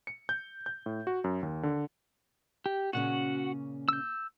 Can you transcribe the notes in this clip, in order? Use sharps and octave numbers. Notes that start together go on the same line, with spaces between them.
C#7
G6
G6
A2
F#4
F#2
D#2
D3
G4
A#2 C#3 C#4 F#4 F#5
E6 G6